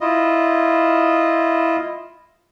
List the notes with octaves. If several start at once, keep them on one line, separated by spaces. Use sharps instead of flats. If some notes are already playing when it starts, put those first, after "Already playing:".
E4 F4 D#5